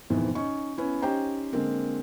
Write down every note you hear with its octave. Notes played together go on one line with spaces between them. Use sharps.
F2 G#2 B2 D#3 E3
C#4 D#4 C#6
B3 C#4 E4
C#4 D#4 G4 C5 G5 A#5
D3 G#3 A#3 C4